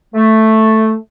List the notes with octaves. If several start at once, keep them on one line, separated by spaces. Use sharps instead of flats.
A3